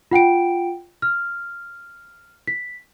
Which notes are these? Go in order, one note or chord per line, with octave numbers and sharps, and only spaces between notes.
F4 F#5 G5 D7
F6
B6